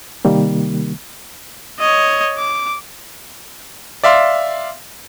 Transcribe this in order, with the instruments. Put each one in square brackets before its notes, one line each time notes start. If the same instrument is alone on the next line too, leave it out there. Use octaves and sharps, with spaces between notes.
[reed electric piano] C3 D#3 G3 A#3
[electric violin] C#5 D#5
D6
[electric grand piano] D5 E5 F5 C6